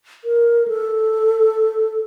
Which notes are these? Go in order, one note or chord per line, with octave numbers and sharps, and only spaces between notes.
A#4
A4